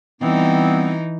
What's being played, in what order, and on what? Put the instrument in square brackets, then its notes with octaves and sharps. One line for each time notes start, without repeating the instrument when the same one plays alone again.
[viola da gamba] E3 D#4 [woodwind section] G3 B3 C4